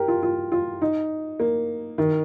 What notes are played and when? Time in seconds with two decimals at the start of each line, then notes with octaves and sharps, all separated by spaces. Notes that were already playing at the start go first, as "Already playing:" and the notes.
Already playing: G4 A#4
0.08 F4
0.23 F4
0.52 F4
0.82 D#4
1.40 A#3
1.98 D#3